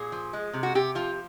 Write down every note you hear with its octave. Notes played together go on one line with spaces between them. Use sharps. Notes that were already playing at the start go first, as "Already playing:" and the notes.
Already playing: A#2 G#4
F3
G#3
C3
F#4
C3 G4
F3 F4